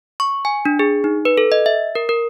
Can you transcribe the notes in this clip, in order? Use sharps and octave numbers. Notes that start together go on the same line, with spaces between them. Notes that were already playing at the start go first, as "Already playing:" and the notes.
C#6
G#5
D4
G#4
D#4
B4
A4
D#5
E5
A#4
A#4